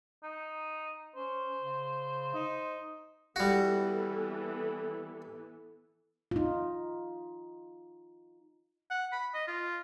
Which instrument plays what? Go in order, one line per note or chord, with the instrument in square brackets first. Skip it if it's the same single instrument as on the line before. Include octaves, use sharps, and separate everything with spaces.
[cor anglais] D#4
[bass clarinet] C#4 [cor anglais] C5
[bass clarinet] C#3
D#4
[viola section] E3 B3 A4 [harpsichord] G3 F#4
[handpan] D#4 F4
[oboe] F#5
B5
D#5
F4